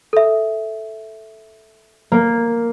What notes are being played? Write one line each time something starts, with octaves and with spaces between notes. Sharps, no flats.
A4 E5
A#3